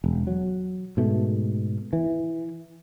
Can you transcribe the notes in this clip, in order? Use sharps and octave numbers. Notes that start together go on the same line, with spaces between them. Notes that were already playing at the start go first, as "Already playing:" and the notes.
E1
F#3
G#2 B2 A3
E3